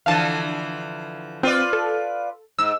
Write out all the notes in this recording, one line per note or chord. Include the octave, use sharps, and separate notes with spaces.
D3 E3 F3 F5 A5
C4 F4 B4 D5
A4
G#2 E6